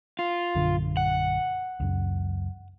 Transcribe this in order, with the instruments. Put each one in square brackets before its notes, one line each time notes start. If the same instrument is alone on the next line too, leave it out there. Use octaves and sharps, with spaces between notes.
[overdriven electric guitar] F4
[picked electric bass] A#1 F#2 D3
[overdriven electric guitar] F#5
[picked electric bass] C#2 F#2